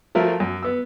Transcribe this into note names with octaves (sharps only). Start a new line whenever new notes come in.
F3 F#3 A3 A#4
F#2
B3 E6